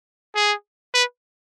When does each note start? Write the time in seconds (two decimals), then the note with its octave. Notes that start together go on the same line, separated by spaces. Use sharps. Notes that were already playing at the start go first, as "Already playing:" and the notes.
0.35 G#4
0.95 B4